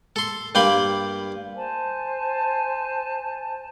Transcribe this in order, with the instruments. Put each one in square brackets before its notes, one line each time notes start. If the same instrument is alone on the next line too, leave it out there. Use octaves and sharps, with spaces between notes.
[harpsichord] A4 C6
G2 A#3 G5 B5 C6
[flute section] C5 G#5 A5